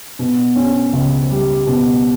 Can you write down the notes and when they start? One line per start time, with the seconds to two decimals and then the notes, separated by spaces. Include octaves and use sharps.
0.19 B2
0.56 C#4
0.93 C#2
1.30 G3
1.66 B2